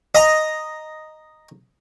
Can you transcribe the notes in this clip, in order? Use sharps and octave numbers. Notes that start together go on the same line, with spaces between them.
D#5 A#5